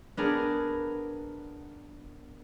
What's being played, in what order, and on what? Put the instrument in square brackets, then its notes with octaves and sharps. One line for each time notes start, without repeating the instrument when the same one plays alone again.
[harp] B3 D4 G#4 A#4